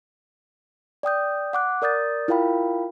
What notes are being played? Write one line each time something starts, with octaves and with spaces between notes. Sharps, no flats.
D5 G5 D#6 G6
F#5 D6 F#6
A#4 D5 D#6 G6 A6
E4 F4 A#4 F5 G5 B5